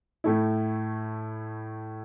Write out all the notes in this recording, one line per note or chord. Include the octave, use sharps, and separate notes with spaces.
A2 A3 E4